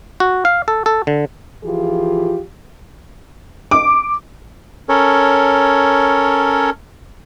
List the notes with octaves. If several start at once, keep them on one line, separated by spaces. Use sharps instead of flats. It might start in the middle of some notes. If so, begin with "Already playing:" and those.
F#4
F5
A4
A4
D3
E3 F3 F4 G4 G#4
D6
C#4 A4 A#4 C#5